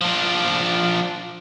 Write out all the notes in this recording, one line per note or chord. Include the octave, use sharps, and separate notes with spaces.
F3 D4